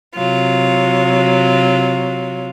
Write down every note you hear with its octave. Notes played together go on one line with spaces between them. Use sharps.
C3 F#3 F4